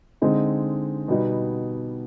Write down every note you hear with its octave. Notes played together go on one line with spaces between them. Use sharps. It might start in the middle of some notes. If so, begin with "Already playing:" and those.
D3 G#3 C4 D#4
B2 G3 B3 D#4